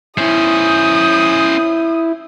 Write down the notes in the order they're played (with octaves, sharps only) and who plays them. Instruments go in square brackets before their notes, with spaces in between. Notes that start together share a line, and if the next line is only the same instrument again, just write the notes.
[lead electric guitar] C#4 C5 [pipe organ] E4 [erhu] D#6